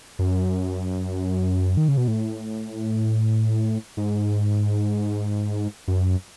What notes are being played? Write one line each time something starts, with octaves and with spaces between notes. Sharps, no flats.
F#2
D#3
C#3
B2
A2
G#2
F#2